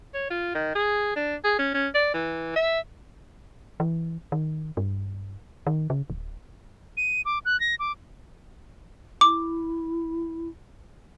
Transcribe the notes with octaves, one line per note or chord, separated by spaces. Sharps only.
C#5
F4
D#3
G#4
D4
G#4
C#4
C#4
D5
E3
E5
E3
D#3
G2
D#3
C#3
D1
D#7
D6
F#6
A#6
D6
E4 D6